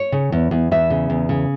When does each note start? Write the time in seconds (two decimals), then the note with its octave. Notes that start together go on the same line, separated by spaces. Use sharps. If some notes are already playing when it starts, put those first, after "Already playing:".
Already playing: C#5
0.12 C#3
0.32 E2
0.51 E2
0.71 E2 E5
0.90 C#3
1.10 E2
1.29 C#3